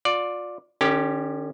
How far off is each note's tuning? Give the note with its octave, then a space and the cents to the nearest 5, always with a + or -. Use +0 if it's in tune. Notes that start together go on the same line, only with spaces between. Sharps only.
F4 +30 D5 +0
D3 +45 C#4 +0 G4 +0